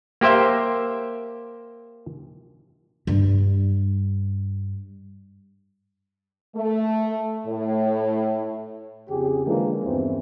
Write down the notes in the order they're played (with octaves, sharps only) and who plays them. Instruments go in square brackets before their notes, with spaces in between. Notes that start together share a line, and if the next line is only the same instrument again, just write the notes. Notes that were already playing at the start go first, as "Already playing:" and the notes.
[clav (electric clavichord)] A#3 G4 C5 E5 G5
[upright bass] G2 G3
[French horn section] A3
A2
[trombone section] F2 C#3 G4 G#4
D3 E3 F3 G#3 A#3
E2 G2 E3 C4 C#4